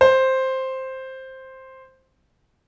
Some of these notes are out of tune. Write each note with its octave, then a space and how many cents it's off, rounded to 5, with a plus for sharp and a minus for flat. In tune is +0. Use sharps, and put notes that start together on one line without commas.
C5 +5